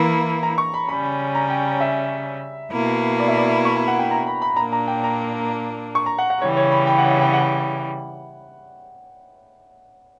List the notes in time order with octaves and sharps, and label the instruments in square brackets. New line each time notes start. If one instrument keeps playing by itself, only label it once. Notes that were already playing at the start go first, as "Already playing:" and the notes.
Already playing: [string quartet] E3 A#3 E4
[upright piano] A#5
C#6
B5
[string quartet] C#3 G3 C#4 [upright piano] B5
[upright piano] A#5
G5
E5
[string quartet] B2 A#3 E4
[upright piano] D5
E5
D5
C#6
B5
F#5
G5
A#5
B5
B5
[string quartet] A#2 A#3 D4 [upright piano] A#5
[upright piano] A#5
G5
A#5
C#6
A#5
F#5
F#5
[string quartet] C#3 E3 G3 [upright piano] C#5
[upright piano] C#5
B5
G5
F#5
E5
G5
F#5